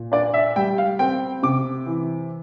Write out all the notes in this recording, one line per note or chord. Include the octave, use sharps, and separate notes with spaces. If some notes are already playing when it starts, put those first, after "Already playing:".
Already playing: A#2
D4 D5
E5
G3 G5
F5
C4 G5
C3 D6
E3